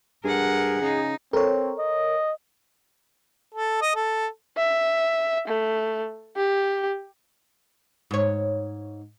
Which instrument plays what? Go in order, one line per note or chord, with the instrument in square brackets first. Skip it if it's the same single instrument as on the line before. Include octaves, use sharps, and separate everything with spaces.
[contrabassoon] G2 [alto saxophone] G#4 [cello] A#4 F#5
[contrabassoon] C#3 [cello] D#4
[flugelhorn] C4 [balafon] A4 [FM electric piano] A#4 C#5
[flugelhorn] D#5
[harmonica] A4
D#5
A4
[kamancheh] E5
A3
G4
[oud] G#2 C#5